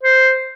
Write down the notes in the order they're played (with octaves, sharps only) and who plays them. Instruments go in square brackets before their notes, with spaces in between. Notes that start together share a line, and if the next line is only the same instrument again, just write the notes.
[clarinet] C5